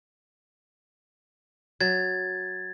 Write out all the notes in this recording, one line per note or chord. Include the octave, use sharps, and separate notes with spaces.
F#3 G#6 A6